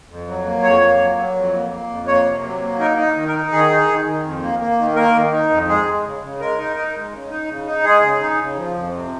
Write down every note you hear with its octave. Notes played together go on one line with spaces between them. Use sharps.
F2
F#3
A#3
F2 C#5
A#3
F#3
F#3
F2
A#3
A#3
F2
A#3 C#5
C3
F#3
A#3
D#4 A#4
D#4
D#3
A#4
D#4
D#3 G#4
D#4
D#3
D#3
F2
A#3
A#3
D#3
A#3 A#4
D#3
D#4
F2
G#3 G#4
G#3
C#3
C#3
G#3 A#4
D#4
D#4
G#3
C#3
D#4
C#3
D#4
G#3 G#4
C#3
D#4
C#3
F3
F2
C3